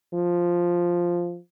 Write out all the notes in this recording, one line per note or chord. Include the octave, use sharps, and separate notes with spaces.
F3